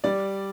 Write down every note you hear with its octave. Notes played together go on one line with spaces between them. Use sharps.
G3 D5